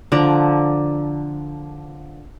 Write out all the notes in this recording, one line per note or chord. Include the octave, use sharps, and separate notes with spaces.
D3 F3 D5 A#5